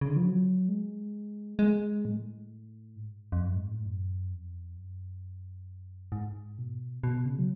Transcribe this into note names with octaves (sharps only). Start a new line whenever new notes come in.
C#3
D3
F3
F#3
G#3
G#3
A2
G#2
F2
F#2
G#2
A2
F#2
F2
F#2
G#2
B2
B2
C#3
F#3